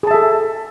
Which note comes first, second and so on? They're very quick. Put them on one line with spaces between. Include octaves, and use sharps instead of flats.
G#4 A5 E5 A4